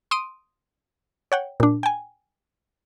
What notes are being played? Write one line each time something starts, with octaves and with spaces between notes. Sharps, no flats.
C6 D#6 D7 D#7
C#5 F#5 G5
A#2 D4
G5 G#5